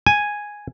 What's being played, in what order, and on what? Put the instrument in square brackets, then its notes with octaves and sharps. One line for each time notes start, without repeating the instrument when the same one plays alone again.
[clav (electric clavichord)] G#5